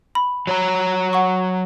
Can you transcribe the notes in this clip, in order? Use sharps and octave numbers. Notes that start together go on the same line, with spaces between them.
B5
F#3 C#5 A#5
F#5 C#6